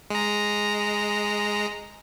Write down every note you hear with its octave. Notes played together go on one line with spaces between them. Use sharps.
G#3 A#5